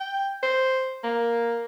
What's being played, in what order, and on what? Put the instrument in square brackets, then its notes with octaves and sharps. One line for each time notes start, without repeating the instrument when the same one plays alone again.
[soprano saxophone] G5
C5
A#3